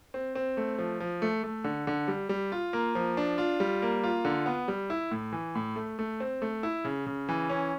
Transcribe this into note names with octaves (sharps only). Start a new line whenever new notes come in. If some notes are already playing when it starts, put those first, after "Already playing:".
C4
C4
A3
F3
F3
A3
A3
D3
D3
G3
G3
F4
A#3
F3
D4
F4
G3
A#3
F4
D3
B3
G3
E4
A2
E3
A2
A3
A3
C4
A3
E4
C#3
C#3
E3
C#4